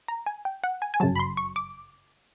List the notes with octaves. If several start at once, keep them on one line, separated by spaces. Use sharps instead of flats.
A#5
G#5
G5
F#5
G#5
G#5
G1 F#2 C#3 F#3 A5
B5
C6
C#6
D6